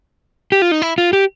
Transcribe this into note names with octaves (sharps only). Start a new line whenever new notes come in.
G4
F4
D#4
E4
F4
G4